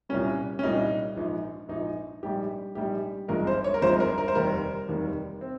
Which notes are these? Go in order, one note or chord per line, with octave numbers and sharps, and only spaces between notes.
C2 A#2 G3 C#4
C#4
C2 A#2 G3 D#4
A#1 G#2 F3
A#1 G#2 F3 D#4
A#1 G#2 G3 G4
A#1 G#2 G3 G4
G#1 G2 F3 G#3 A#4
C5
C#5
A#4
G#1 G2 F3 G#3 C5
A#4
A#4
C5
F1 D#2 D#3 G3 A#4
F1 D#2 D#3 G3
C4